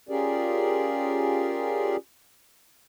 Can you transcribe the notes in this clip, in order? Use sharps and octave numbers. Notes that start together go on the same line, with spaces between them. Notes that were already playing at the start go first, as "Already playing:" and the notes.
C#4 F4 G4 G#4 A#4 D5